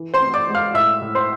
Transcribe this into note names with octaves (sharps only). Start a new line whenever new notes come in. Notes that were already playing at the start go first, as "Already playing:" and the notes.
Already playing: E3
C5 C6
C4
D5 D6
G#3
F5 F6
A2 E5 E6
A2
C5 C6